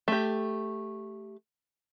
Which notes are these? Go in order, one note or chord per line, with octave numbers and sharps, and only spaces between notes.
A3 G4